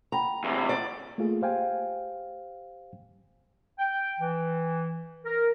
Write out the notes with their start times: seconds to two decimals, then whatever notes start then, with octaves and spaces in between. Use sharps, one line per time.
0.12 F#5 G5 A#5 B5
0.44 E2 C3
0.69 D5
1.18 A3 A#3 F4 G#4
1.42 G4 C5 F5 G5 G#5
3.79 G5
4.20 E3
5.25 A#4